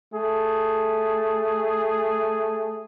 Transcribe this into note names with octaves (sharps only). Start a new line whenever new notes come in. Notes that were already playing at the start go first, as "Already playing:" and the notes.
A3 G#4